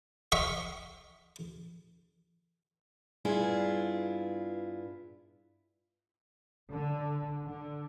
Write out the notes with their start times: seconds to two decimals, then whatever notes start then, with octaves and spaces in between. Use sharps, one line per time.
0.32 E5 C#6
3.25 G2 B3 E4 F4 G#4
6.71 D3
7.45 D3